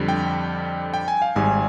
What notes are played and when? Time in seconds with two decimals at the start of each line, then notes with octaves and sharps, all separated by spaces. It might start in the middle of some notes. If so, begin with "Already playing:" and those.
Already playing: F2 D3 G3
0.09 G5
0.94 G5
1.08 G#5
1.22 F5
1.36 G#1 G#2 G3 G#5